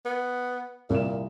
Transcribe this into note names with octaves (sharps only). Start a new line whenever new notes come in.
B3
C2 A#2 E7